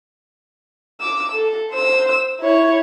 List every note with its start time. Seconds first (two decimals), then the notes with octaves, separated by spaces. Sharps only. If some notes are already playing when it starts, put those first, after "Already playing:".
1.00 D6 E6
1.33 A4
1.73 C5 E6
2.41 E4 C#5